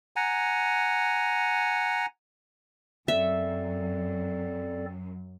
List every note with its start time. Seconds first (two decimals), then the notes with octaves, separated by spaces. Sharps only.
0.16 F#5 G#5 A#5
3.08 F#2 C4 A4 D5 E5